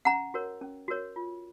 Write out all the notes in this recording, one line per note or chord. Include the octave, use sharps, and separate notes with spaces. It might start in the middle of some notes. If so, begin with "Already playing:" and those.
C#4 F#5 A#5
F#4 A#4 C#5
C#4
F#4 A#4 C#5
F4